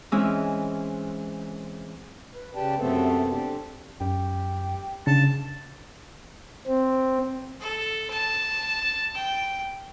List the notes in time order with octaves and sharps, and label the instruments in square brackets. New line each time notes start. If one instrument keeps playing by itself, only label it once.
[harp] E3 G#3 C4 C#4 E4
[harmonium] B4
C#3 G4 B4 D5 G5 A5
F#2 C3 A3 B3 C4 A4
C4 D4 G4 A4
[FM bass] F#2 [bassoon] G4
[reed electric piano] C#3 [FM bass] D4 [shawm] A5
[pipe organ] C4
[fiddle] A4
A5
G5